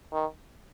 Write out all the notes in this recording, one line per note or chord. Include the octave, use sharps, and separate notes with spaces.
D#3